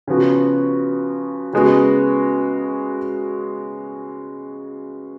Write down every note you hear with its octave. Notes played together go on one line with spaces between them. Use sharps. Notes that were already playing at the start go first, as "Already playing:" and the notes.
C#3 F3 B3 F#4
C#3 G#3 B3 F#4